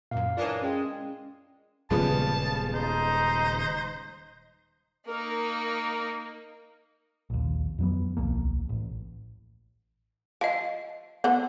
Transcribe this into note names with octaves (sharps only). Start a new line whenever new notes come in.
F#2 A#2 F5
E3 C#4 D4 F4 A#4 D#5
G#3 C#4 G5
D#1 C#3 F3 G3 G#3 B3 A5
D#4 C5
A#3 D#4 A#4
A#1 D#2
F2 F#3 B3
D1 B1 F3 A#3
A1
F3 D#5 F5
B3 A4 C5 F#5